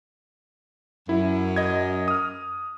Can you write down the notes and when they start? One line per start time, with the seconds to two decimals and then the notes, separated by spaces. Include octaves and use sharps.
1.09 F#2 E4
1.56 D#5 G#6
2.08 D#6 F6